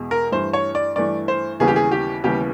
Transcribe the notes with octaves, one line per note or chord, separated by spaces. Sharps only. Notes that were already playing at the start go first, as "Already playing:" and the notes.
Already playing: E2 B2 G#3
A#4
G2 E3 A3 C5
C#5
D5
G2 E3 A3 D5
C5
D#2 C#3 E3 G3 B3 G#4
G4
G#4
G4
D#2 C#3 E3 G3 B3 G4